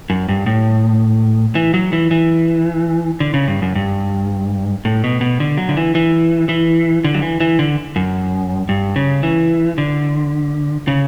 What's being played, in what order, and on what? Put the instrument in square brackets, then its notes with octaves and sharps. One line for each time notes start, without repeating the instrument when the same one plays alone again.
[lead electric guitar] F#2
G2
A2
E3
F#3
E3
E3
D3
C#3
G2
F#2
G2
A2
B2
B2
D3
F#3
D3
E3
E3
E3
D3
F#3
E3
E3
D3
F#2
G2
C#3
E3
D3
C#3